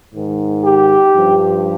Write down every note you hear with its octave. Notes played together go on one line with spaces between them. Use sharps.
G#2 D#3
G4
G2 F3